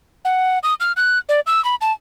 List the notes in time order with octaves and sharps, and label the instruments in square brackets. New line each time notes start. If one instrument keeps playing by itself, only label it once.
[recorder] F#5
D#6
F6
F#6
D5
E6
B5
A5